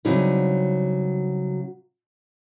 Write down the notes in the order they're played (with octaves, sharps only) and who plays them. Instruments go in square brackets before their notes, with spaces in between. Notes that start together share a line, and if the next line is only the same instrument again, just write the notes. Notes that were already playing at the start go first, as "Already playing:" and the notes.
[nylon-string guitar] C#3 F#3 G3 C4 D#4 E4